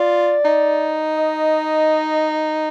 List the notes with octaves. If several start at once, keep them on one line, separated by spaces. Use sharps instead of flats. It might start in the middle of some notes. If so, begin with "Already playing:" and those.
Already playing: F4 D5
D#4
D#5